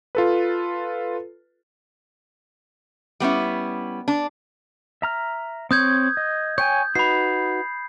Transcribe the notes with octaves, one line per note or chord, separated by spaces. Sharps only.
F4 A4 B4
G3 B3 C#4 E4
D4
E5 A#5 F6
C4 C#5 D#6 G6 G#6
D#5
C#5 G5 G#5 G6
D#4 F#4 B4 B5 C7